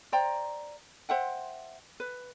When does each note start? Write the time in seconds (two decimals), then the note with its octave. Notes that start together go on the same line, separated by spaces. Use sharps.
0.12 C5 D5 G5 A#5
1.09 C5 E5 F#5 G5
2.00 B4